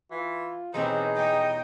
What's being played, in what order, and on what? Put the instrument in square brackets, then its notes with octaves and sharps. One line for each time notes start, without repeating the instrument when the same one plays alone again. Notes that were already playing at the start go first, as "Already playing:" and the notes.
[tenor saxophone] E3 [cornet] F4
[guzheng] E2 B2 F#3 [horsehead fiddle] C4 G4 [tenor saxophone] D#4 [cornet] G#4
[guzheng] G4 C#5 [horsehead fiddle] D#5 G5